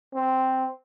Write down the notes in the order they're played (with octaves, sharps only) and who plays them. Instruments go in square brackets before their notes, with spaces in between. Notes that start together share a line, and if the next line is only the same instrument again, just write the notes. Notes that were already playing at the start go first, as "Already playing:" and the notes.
[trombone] C4